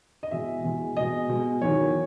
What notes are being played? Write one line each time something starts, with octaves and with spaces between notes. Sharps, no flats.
D#5
E2 B2 G#3 E5
E2 B2 G#3
B2 G#3 D#5
B2 G#3
E2 D#3 F#3 C#5